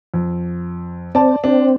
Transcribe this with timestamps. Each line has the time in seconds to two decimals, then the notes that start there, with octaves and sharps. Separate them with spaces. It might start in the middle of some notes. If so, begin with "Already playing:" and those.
0.14 F2
1.15 C4 D5 A5
1.44 C4 D4